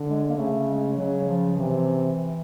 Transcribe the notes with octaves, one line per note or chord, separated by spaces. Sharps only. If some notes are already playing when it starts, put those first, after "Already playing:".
Already playing: D3
G#3
A#3
C#3 A3
G#3
C#3 F#3
F3
C3 E3